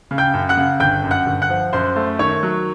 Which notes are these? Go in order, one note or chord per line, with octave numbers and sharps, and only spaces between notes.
C#3
G5 G6
F#2
F#5 F#6
C#3
G1 G5 G6
F#2
F#5 F#6
G1
F#5 F#6
F3
F#2 C5 C6
A3
D#3 C#5 C#6
F#3